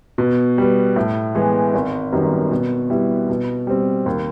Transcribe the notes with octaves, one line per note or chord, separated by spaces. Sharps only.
B2
G3 B3
A2
E3 G#3 B3
G#1
F#2 D#3 G3 B3
B2
G3 B3 E4
B2
G3 C4
D#2